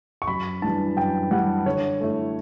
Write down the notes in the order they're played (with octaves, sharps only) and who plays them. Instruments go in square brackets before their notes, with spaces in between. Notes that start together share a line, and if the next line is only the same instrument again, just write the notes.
[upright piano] C#6
F#2 B5
E3 G3 D4 A5
F#2 G5
E3 G3 D4 F#5
D3 C#5
A3 E4